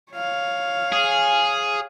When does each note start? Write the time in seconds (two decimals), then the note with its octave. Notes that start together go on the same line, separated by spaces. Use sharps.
0.12 C#5 F5
0.93 G#4